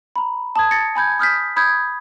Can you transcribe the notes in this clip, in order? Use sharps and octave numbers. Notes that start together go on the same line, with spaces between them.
A#5 B5
A5 D#6 G#6
A6 A#6 C#7
G#5 B5 G6 G#6
D#6 F6 G6 B6
B5 D#6 G6 G#6